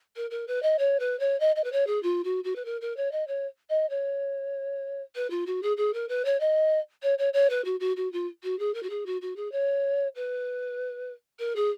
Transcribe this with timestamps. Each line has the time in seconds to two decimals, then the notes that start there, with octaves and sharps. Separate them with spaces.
0.16 A#4
0.31 A#4
0.47 B4
0.62 D#5
0.79 C#5
0.99 B4
1.19 C#5
1.40 D#5
1.56 D#5
1.64 B4
1.72 C#5
1.87 G#4
2.03 F4
2.24 F#4
2.44 F#4
2.55 B4
2.65 A#4
2.81 A#4
2.97 C#5
3.12 D#5
3.27 C#5
3.69 D#5
3.90 C#5
5.15 B4
5.30 F4
5.46 F#4
5.63 G#4
5.77 G#4
5.94 A#4
6.08 B4
6.25 C#5
6.40 D#5
7.03 C#5
7.18 C#5
7.33 C#5
7.50 B4
7.65 F#4
7.80 F#4
7.96 F#4
8.12 F4
8.43 F#4
8.59 G#4
8.74 A#4
8.83 F#4
8.90 G#4
9.06 F#4
9.21 F#4
9.36 G#4
9.52 C#5
10.15 B4
11.39 A#4
11.56 G#4